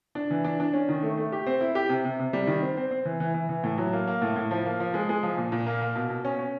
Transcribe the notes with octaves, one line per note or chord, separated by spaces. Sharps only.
D4
E3
D4
D4
C#4
D#3
A3
A3
G4
C4
E4
G4
C3
C3
C3
G3
D#3
C4
C4
C4
E3
E3
E3
E3
A2
F#3
A#3
A#3
A2
A2
F3
A#3
F3
G#3
G#3
F3
A#2
A#2
A#3
A#3
B2
B2
C#4
C#4